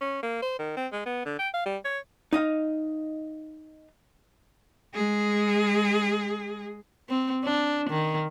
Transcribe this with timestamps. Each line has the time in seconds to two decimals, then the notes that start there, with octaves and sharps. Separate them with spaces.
0.01 C#4
0.23 A#3
0.42 C5
0.59 D#3
0.77 C4
0.93 G#3
1.06 B3
1.26 D3
1.39 G5
1.54 F5
1.66 G3
1.85 C#5
2.33 D#4 D#5 F5
4.94 G#3 G#4
7.09 C4
7.44 D4
7.90 D#3